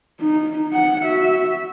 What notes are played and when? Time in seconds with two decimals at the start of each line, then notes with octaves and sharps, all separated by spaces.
0.21 D#4
0.73 F#5
1.05 F#4 E5